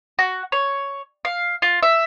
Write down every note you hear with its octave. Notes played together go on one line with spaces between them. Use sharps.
F#4
C#5
F5
F4
E5